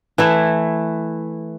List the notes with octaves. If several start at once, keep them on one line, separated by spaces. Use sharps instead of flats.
E3 A3 E4